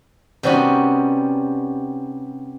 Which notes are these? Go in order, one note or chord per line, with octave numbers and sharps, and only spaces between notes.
C3 G3 B3 C#4 D#4 F#4